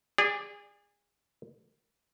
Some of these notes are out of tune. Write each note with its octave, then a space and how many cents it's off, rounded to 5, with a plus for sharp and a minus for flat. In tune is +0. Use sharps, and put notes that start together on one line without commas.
G#4 -25 D5 +10